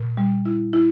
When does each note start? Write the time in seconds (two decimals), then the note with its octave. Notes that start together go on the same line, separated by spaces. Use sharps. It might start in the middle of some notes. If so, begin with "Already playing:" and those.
Already playing: A#2
0.17 G3
0.45 E4
0.73 E4